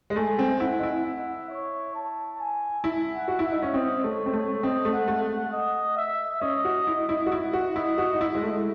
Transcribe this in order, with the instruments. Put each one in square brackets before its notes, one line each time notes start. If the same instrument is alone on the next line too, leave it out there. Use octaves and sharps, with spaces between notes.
[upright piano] G#3
[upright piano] A3 [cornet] G#5
[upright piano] C4
[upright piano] E4 [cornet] F#5
[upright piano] D#4
E4
[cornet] E5
C#5
A5
G#5
[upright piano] E4
[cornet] F#5
[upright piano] F#4
[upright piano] E4 [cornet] E5
[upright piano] D#4
C#4
[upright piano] C4 [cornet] D#5
[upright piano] A3 [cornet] C#5
[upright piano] C4
[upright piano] A3 [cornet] C#5
[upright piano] C4 [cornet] D#5
[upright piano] A3
[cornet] F#5
[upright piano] A3
[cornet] F#5
D#5
E5
[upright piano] C#4 [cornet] D#5
[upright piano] F#4
E4
E4
F#4
E4
F#4
[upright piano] E4 [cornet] D#5
[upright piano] F#4
D#4
[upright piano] E4 [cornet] E5
[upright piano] G#3
A3